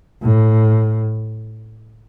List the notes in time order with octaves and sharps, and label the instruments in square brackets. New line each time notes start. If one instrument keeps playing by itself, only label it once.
[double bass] A2